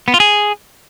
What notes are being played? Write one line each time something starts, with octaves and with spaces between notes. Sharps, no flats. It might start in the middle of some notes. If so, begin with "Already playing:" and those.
B3
F4
G#4